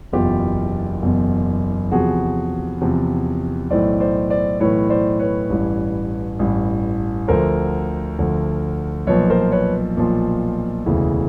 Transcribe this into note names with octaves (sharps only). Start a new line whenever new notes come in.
F#1 E2 B2 F4 G4
F#1 E2 B2
E2 C3 F3 F#4 G#4
E2 C3 F3
B1 A2 E3 C5 D5
C5 D5
C5 D5
B1 A2 E3 B4 C#5
C5 D5
B4 C#5
A1 G2 E3
A1 G2 E3
D2 D3 F3 A#4 C5
D2 D3 F3
B1 A#2 F3 B4 C#5
A#4 C5
B4 C#5
B1 A#2 F3
E1 D2 C#3 E3